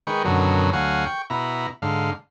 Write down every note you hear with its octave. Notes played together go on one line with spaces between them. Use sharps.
D#3 G#3 B4 G5 C#6
F#2 B2 D3 D#3 F#3
D2 F#3 F5 F#5 G#5
G5 C#6
B2 E4 A#5
G#2 D3 F5